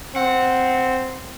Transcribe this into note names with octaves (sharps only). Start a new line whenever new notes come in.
C4 F#5